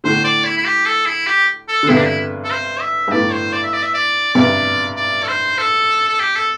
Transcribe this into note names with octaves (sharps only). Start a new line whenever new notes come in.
A2 D3 C5
D5
E4
E4
G4
A4
E4
G4
A4
D3
G2 C3 E4
D4
E4
A4
C5
E5
G2
A2 D5
C5
D5
E5
D5
E5
D5
G2 C3 D5
D5
A4
C5
A4
A4
G4
A4